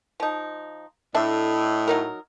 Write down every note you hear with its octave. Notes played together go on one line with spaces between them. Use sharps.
F3 D#4
A2 D4 D#5 E5
F#3 D#4 A#4